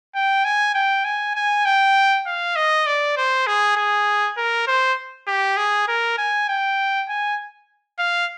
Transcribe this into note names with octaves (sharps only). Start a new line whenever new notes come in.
G5
G#5
G5
G#5
G#5
G5
F5
D#5
D5
C5
G#4
G#4
A#4
C5
G4
G#4
A#4
G#5
G5
G#5
F5